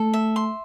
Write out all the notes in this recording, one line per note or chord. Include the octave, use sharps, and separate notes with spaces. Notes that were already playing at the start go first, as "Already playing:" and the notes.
Already playing: A3 A4
E5
C6